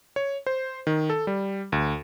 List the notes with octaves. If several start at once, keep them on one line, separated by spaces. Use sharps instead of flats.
C#5
C5
D#3
A4
G3
D2